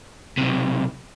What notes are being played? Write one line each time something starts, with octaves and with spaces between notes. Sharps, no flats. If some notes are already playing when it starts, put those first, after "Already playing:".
B1 C3